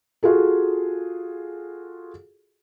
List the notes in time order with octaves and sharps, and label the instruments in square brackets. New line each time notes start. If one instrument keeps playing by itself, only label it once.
[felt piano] F4 F#4 G#4 A4